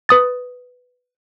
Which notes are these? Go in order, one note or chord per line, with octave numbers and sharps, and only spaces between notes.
B4 D#6 A6